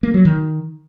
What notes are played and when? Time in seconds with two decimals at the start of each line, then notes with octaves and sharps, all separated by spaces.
0.03 A#3
0.14 F#3
0.25 D#3